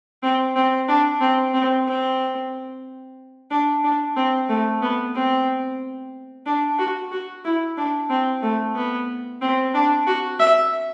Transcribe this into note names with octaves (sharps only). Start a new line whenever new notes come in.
C4
C4
D4
C4
C4
C4
D4
D4
C4
A3
B3
C4
D4
F#4
F#4
E4
D4
C4
A3
B3
C4
D4
F#4
E5